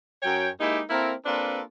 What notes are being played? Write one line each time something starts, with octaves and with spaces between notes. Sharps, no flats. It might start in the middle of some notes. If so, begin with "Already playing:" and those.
F#2 F#3 C#5 G5
G#3 A#3 D#4 E4 G4
A#3 C4 E4 A4 A#4
A#3 C4 D4 F4 A4 B4